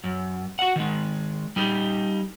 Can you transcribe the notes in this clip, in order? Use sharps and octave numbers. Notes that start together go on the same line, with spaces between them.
F#2
F#4 F#5
D#3 G#3
G3 D#4 G4